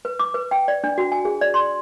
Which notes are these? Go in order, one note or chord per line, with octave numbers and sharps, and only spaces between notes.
B4
D6
B4
G5
D5
D4
F#4
G#5
G#4
D5
C6